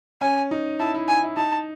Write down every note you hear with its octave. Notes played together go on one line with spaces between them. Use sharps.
C#4 G#5
D#4
E4 A5
E4
G#5
E4
D#4 A5